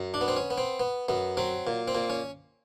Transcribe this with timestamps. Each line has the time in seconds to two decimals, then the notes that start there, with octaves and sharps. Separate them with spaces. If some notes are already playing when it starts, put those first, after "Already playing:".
Already playing: F#2
0.14 D4
0.21 B3
0.28 C4
0.37 C#4
0.50 B3
0.58 C4
0.80 B3
1.08 F#2 B3
1.37 F#3 C4
1.67 A#2
1.88 C4
1.95 A#2
2.10 C#4